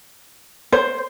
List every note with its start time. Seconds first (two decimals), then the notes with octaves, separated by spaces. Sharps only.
0.73 C5